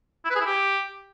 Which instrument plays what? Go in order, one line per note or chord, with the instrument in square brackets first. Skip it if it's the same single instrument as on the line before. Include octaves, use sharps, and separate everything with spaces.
[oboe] E4
B4
G#4
E4
G4